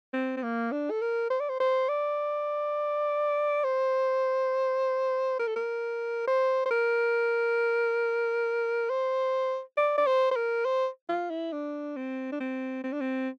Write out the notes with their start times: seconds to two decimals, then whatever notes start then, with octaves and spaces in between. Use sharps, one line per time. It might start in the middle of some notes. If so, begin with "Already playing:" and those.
0.13 C4
0.37 C4
0.43 A#3
0.72 D4
0.90 A4
1.01 A#4
1.30 C5
1.40 D5
1.49 C5
1.60 C5
1.89 D5
3.64 C5
5.39 A#4
5.47 A4
5.56 A#4
6.27 C5
6.65 C5
6.70 A#4
8.90 C5
9.77 D5
9.97 D5
10.06 C5
10.31 C5
10.36 A#4
10.65 C5
11.09 F4
11.30 E4
11.52 D4
11.96 C4
12.32 D4
12.40 C4
12.83 C4
12.92 D4
13.01 C4